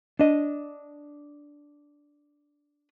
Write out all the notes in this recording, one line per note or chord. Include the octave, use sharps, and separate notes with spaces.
D4 D#5